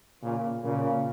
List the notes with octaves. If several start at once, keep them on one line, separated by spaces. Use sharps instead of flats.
A#2 C#3
A#2 C#3